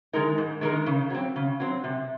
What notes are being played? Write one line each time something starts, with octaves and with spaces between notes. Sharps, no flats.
D#3 G#3 D#4 A#4
G#2
D#3 G#3 D#4 A#4
C#3
F#3 C4
C#3
F#3 C4
C3